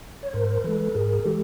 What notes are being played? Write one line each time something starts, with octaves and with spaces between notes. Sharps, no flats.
C#5
G#2 A#4 C5
E3 G#3 A4 B4
G#2 G#4 A#4
E3 G#3 G4 A4